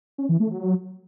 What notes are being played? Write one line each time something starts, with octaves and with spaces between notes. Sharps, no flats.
C#4
E3
A3
F#3